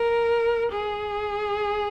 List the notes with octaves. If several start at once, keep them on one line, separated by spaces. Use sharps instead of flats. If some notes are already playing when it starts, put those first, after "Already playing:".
Already playing: A#4
G#4